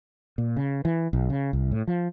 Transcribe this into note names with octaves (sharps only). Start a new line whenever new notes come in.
A#2
C#3
E3
B1
C#3
C2
A2
F3